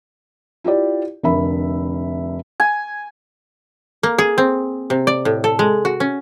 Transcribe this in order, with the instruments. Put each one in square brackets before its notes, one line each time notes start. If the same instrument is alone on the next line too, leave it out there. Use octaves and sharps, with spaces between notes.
[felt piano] E4 F4 G4 D5
F1 D3 A#4 E5 B5
[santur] G#5
[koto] A#3
G#4
C4
C3
D5
A2
A4
G#3
F#4
C#4